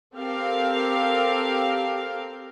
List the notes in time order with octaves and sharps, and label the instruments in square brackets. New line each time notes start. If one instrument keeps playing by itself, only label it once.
[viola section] C4 G4 A4 A#4 F5